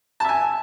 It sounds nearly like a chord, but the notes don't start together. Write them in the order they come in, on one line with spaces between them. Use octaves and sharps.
A5 E5 G#5